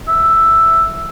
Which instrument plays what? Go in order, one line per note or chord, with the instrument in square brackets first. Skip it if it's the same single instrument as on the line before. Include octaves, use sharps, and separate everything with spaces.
[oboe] E5